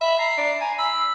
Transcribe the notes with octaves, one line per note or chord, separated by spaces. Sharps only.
E5 B5
A#5 C7
D4
G#5 A#5
B5 E6